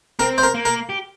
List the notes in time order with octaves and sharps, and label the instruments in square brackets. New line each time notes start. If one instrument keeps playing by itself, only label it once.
[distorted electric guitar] C4 [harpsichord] A#4
[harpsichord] C5
A#4
[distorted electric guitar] A#3
[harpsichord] A#4
[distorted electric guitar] G4